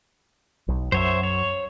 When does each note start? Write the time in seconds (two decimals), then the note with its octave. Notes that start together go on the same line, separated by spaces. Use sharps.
0.68 B1
0.92 F#2 F#3 C5 C#5 E5
1.23 C#5